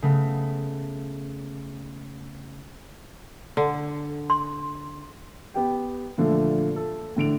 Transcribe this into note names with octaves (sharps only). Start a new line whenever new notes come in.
C#3 A3 B3
D3
C6
B3 G4 G5
A#2 D3 F3 A3
A4
A2 D3 D7 F7